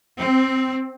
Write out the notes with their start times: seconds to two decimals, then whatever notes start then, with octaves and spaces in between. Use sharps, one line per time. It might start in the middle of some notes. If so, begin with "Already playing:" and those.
0.20 C4